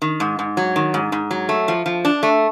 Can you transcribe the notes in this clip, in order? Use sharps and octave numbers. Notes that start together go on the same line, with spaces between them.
D#3
G#2
G#2
F#3
D#3
G#2
G#2
F#3
A3
F3
F3
D4
A3